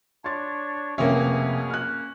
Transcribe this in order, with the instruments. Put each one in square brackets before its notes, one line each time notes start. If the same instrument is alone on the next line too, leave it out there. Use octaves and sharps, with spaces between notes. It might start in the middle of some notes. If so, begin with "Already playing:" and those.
[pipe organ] D4 C#5 [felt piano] C6 A6
[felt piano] F1 C4 E5 [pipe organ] B2 G#4 [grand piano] A#3 C#4
[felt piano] F6 F#6